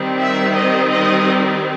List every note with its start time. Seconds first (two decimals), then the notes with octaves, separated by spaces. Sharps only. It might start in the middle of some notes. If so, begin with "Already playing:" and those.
Already playing: D#3 G3 C4
0.20 E5
0.57 D#5
0.92 D#5